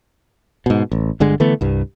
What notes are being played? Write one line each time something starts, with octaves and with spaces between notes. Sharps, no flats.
G#2 B2
A1
G1 D3 G#3
D3 E3 A3 B3
C2 G2